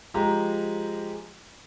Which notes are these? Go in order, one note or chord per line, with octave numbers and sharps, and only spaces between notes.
F3 G#3 G4 A#5